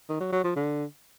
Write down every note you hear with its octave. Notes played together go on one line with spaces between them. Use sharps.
D#3
F#3
F#3
F3
D3